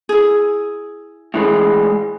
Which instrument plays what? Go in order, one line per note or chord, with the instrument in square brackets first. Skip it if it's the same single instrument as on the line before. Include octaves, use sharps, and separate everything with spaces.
[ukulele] E4 G#4
[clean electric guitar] A2 E3 G#3